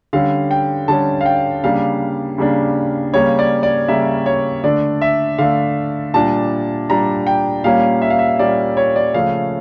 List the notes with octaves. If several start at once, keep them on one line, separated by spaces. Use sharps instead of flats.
D3 G3 C#4 F5
G5
D3 G3 C#4 A5
F5
G5
C#3 G3 A#3 D4 F5
C#3 G3 A#3 D4
C#3 G3 A#3 C#5
D5
D5
C#3 G3 A#3 E5
C#5
D3 A3 D4 D5
E5
D3 A3 D4 F5
A#2 G3 D4 A5
A#2 G3 D4 A#5
G5
A#2 G3 A#3 C#4 F5
E5
F5
E5
A#2 G3 A#3 C#4 D5
C#5
D5
C#3 F3 A3 C#4 F5